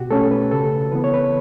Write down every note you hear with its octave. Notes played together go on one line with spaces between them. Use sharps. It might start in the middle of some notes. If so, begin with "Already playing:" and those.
Already playing: B2 F#4 G4
A3 C#4 A4
B4
C#3 A4
E3 B3 B4
C#5
B4